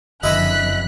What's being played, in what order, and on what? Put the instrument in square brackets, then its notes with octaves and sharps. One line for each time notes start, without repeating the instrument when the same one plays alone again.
[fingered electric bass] F#1 [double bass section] F2 D3 [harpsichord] E4 D#5 [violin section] F#6 B6